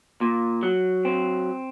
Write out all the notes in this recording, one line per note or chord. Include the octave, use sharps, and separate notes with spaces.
A#2
F#3
C4